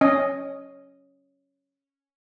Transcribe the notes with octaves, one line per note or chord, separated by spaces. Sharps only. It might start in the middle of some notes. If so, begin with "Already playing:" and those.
C#4 D#5